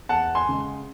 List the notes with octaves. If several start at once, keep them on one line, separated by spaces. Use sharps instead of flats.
E2 F#5 A5
G#5 C6
C#3 G#3